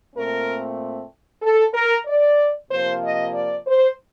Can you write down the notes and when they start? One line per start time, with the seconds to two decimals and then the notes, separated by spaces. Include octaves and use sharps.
0.14 A#2 A3 C4 A#4
1.42 A4
1.73 A#4
2.06 D5
2.69 C3 F3 A#3 C5
3.01 D#5
3.32 D5
3.65 C5